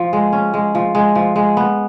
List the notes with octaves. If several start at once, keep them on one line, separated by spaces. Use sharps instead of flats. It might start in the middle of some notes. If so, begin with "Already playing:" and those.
Already playing: F3
G#3
C#4
G#3
F3
G#3
F3
G#3
B3